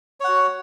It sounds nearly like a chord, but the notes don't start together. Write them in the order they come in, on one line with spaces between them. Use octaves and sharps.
C#5 F#5 F#4